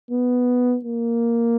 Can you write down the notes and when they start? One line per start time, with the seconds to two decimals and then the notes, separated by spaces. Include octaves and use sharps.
0.11 B3
0.85 A#3